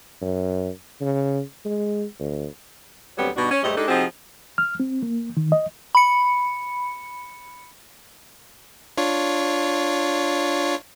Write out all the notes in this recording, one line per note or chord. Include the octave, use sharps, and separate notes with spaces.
F#2
C#3
G#3
D2
D2 F#3 G3 B3 C4 G4
G2 B2 D4 D#4 F#4
C#4
D#2 G#2 G3 A3 G4 D#5
G#3 D4 D#4 G4 A4
C3 F3 C4 D#4 F#4 G#4
F6
C4
A#3
D#3
D#5
B5 C#7
D4 F4 C#5